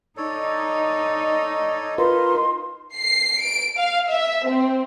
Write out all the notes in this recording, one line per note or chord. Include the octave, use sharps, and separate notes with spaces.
D#4 A4 C#5 D5
F4 A#4 B4 C6
C7
D7
F5
E5
C4